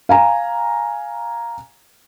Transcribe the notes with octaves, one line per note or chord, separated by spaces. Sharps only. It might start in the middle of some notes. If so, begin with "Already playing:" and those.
F5 G#5 A#5